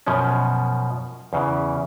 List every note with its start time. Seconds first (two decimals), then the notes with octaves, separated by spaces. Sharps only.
0.07 F#2 B2 F3 C#4
1.33 E2 C#3 E3